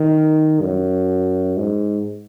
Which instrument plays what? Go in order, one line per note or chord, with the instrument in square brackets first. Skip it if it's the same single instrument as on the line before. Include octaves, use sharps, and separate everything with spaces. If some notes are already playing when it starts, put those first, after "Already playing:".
Already playing: [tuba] D#3
F#2
G#2